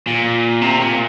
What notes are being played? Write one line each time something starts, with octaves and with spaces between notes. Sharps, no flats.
A#2
C3
A#2